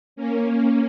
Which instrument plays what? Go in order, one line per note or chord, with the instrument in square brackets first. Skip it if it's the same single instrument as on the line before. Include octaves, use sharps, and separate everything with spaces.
[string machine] A#3 C#4